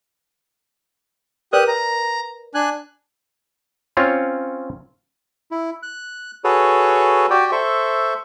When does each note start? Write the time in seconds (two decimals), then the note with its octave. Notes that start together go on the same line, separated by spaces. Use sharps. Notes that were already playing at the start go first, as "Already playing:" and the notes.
1.53 G4 A#4 B4 D5 D#6 F#6
1.68 A#5
2.55 D4 G#5 F#6
3.97 C4 C#4 F4 C#5
5.51 E4
5.83 F#6
6.44 F#4 G#4 A4 B4 C#5
7.30 F#4 G4 D5 G5
7.52 A4 C5 E5 C#6